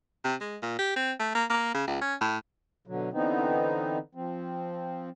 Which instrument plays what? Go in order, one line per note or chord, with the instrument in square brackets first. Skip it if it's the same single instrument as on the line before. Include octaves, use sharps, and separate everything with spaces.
[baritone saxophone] C3
G#3
A#2
G4
C4
A3
A#3
A#3
C#3
C#2
C#4
A2
[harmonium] B2 D3 F#3
D3 E3 B3 C4 D#4
F3 C4